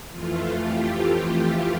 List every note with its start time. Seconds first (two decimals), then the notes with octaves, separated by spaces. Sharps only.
0.11 F2 E3 A3 F4
0.61 G4